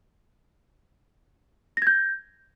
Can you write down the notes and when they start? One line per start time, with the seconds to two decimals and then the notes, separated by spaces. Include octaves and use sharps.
1.77 A#6
1.82 G#6
1.87 G6